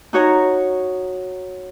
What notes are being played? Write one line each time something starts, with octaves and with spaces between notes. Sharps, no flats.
D#4 F#4 C#5 A#5